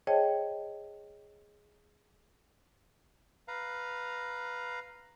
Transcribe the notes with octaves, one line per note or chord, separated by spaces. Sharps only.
G#4 C5 C#5 D#5 G5 A5
B4 F5 A#5